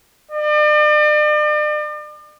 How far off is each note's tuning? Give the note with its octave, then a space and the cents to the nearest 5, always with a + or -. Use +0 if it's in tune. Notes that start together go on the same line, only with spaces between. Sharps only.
D5 +40